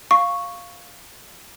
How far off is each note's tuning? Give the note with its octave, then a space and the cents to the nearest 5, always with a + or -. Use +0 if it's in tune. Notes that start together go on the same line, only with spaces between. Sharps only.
F5 +0 C#6 +0